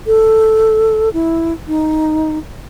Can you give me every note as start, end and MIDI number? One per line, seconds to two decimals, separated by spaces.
0.07 1.09 69
1.13 1.53 64
1.68 2.38 63